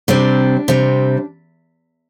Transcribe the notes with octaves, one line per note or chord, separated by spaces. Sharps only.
C3 G3 C4 D4
C3 G3 C4